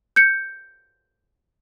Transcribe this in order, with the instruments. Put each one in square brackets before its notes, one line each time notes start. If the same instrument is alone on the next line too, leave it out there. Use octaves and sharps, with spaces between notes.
[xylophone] G6 C#7